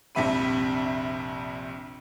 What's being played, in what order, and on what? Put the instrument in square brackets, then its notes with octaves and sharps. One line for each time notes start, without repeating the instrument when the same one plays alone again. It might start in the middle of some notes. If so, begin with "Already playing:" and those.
[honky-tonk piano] A#1 F2 C3 E5 B5 D#7